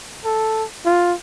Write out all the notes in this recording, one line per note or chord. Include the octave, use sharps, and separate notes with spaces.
A4
F4